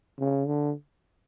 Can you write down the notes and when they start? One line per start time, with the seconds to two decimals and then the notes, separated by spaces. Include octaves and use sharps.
0.19 C#3
0.47 D3